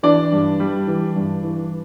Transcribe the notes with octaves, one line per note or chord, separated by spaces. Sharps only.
E3 D4 D5
G2
G3
E3
G2
E3